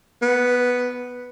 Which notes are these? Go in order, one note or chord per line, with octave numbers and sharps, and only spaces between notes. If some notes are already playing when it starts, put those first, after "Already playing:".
B3